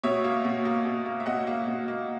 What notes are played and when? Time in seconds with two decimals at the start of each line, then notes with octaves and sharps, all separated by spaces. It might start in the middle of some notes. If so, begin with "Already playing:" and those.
0.03 B2 C#5 E5
0.24 A#3
0.45 B2
0.65 A#3
0.85 B2
1.06 A#3
1.20 E5
1.26 B2 D#5 F#5
1.47 A#3
1.67 B2
1.88 A#3